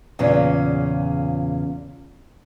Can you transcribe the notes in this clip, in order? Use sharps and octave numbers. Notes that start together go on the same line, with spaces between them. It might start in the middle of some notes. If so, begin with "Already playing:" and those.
E2 A#2 C#3 C#4 F4